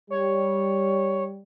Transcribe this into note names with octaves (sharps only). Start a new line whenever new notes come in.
G3 C#5